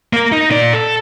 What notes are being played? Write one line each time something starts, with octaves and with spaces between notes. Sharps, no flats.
A#3 A#4
D#4
A#2 D5
A4